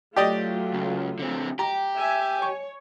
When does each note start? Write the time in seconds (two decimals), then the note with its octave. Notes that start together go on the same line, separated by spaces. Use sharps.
0.16 F#3 A3 F4 G4 D5 D#5
0.74 C#2
1.19 D3 C4
1.59 G4 A#5
1.97 E5 G#5
2.42 C#5 C#6